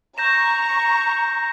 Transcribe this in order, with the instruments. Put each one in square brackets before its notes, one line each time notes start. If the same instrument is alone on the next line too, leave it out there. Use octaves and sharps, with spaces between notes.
[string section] A#5 C#6 [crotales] G6 A#6 E7